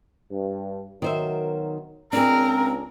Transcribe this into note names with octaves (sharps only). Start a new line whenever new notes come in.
G2
B2 D#3 F#3 A#4 C5 E5
C#2 C4 D4 G#4 A#4